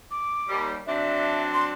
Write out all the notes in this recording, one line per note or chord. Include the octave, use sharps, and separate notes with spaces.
D6
D#2 G3
F#3 C4 D4 E5
C6